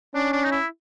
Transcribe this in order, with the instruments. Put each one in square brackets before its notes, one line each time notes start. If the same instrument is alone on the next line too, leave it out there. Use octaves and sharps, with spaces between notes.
[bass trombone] C#4 [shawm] D4
[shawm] D4
D#4
E4